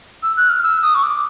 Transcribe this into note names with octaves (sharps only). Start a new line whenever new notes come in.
E6
F#6
F6
E6
D#6
C#6
D6